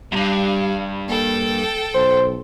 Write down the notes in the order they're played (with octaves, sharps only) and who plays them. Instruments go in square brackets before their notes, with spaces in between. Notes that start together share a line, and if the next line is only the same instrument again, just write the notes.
[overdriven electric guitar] E2 G2 [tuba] G3 [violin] F5
[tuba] A#3 [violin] A4 G5
[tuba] B1 [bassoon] C5